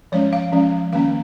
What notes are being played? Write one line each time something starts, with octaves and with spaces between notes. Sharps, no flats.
F3 G#3 C#4 C#5
F5
F3 G#3 C#4
D#3 A#3 C#4 F5